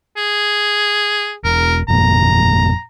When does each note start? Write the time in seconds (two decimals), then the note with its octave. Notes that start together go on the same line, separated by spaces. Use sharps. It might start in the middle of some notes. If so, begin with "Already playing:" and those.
0.17 G#4
1.44 E1 A#4
1.88 G1 F2 A#2 A#5